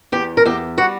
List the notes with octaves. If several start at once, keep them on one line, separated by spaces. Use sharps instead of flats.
E2 G4
A#4
E2 G4
G3 F#4